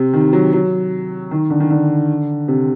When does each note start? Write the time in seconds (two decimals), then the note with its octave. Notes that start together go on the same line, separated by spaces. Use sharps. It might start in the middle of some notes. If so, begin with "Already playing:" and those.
Already playing: C3
0.13 D#3
0.33 F#3
0.53 F#3
1.31 D#3
1.50 D3
1.60 D#3
1.70 D3
2.48 C3